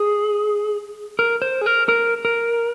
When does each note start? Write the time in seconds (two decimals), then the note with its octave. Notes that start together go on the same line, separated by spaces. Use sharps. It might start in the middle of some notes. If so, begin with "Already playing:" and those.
Already playing: G#4
1.19 A#4
1.42 C5
1.61 G#4
1.66 A#4
1.89 A#4
2.25 A#4